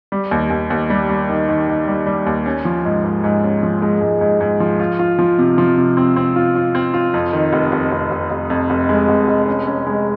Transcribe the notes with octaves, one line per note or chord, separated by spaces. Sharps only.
G3
D#2
D#2
D#2
G3
G3
D#3
D#3
D#3
G3
G3
D#2
C#4
F3
G#2
G#2
G#2
C#4
F3
G#3
G#2
G#2
G#2
F3
F4
F4
F3
C3
F3
C3
C4
C4
F4
F4
C4
F4
F2
D#3
F1
F1
F1
F1
F1
F2
F1
G#3
F1
F1
C#4
C#4
G#3